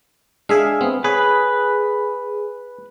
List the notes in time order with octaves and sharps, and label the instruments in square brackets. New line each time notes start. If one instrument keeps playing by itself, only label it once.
[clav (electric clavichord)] G#3 D4 [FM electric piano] G#4 E5 F5
[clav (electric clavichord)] B3 C4
[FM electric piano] G#4 [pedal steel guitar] B4 [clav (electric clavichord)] C#5